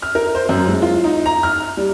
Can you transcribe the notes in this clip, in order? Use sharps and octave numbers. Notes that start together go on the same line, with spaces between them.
F6
A#4
C5
F#2
G#3
F4
D#4
A#5
F6
G3